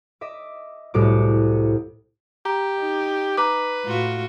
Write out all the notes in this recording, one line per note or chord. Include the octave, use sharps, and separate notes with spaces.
D#5 E5 D6
C2 A2 F#4 D6
G4 A#5
D#4
B4 A#5 D6
A2 F4 F#4